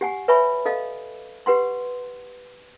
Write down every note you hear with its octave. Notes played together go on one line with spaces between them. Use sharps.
G4 F#5 G#5
B4 C#5 E5 G#5 B5 C#6
A4 D#5 F5
G4 B4 F#5 C6